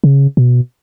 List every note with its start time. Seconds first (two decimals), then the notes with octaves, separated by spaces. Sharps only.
0.04 C#3
0.37 B2